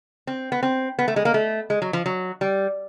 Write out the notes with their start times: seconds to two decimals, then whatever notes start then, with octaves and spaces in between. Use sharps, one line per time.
0.27 C4
0.52 B3
0.63 C4
0.99 B3
1.08 A3
1.16 G#3
1.25 A#3
1.34 A3
1.70 G#3
1.82 F#3
1.93 F3
2.06 F#3
2.41 G3